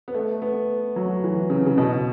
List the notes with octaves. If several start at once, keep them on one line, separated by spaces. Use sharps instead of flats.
B3
A3
B3
F#3
E3
C#3
C#3
B2